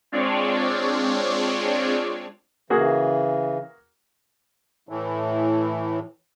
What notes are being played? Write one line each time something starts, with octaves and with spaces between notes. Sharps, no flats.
G#3 C4 D4 F4 C#5 D5
C#3 E3 A#3 F#4 G#4
A2 E3